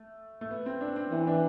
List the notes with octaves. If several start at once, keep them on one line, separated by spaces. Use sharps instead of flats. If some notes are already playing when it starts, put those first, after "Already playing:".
Already playing: A3
A3
B3
C4
D4
C4
E3 B3
D4